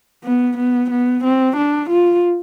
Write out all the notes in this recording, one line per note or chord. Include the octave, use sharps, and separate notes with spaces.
B3
B3
B3
C4
D4
F4